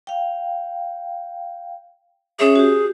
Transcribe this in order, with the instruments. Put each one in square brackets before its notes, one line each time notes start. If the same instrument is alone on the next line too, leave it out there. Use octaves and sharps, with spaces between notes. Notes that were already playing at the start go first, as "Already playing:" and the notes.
[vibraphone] F5 G5
[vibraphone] C#4 C#5 E5 [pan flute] G#4
[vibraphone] F#4 G4